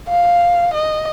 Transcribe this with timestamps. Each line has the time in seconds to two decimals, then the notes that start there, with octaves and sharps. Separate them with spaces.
0.08 F5
0.74 D#5